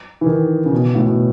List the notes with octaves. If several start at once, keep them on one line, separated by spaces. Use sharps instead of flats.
E3
D#3
C#3
B2
A2
B2